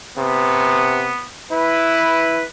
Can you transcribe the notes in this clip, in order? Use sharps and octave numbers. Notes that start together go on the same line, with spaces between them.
C3 B3
E4 B4